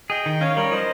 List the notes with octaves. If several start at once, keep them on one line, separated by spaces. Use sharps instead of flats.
G#4 D#5 G5
D#3
C#4 C#5 F5
G3 A#4 C#5
F3 C5 D#5